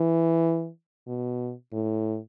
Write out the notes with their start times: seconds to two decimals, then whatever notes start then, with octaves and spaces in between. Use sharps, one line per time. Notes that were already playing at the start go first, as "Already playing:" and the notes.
Already playing: E3
1.07 B2
1.73 A2